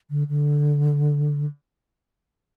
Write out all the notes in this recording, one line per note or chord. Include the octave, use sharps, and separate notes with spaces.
D3
D3